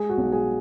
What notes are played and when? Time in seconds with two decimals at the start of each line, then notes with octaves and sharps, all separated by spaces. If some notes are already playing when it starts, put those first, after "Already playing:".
Already playing: G#3 G#4
0.10 F#4
0.18 B1
0.32 G#4